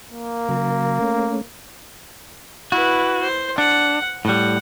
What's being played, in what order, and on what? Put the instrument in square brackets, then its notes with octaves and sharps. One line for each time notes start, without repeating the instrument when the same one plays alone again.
[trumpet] A#3
[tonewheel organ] C#3 F#3 A#4
A3 C#4
[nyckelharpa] E4 B4 [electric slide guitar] F#4
[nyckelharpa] C5
[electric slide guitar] D4 [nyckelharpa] F#5
[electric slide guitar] A2 G3 [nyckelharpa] F#5